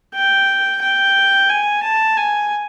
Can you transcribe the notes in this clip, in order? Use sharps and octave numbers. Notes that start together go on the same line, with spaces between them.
G5
G5
G#5
A5
G#5